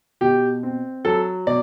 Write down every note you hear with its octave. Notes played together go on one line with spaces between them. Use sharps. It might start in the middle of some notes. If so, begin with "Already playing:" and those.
B2 G4
C4
F#3 A4
B2 D5